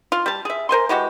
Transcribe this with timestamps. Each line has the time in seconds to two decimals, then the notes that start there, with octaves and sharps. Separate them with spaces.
0.12 F4
0.26 G3 A5
0.45 G#4 E5
0.69 A#4 C5 G#5 C6
0.89 E3 G#3 F#4 G4